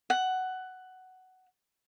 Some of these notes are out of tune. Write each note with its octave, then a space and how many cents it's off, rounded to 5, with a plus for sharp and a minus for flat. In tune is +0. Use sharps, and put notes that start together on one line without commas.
F#5 +10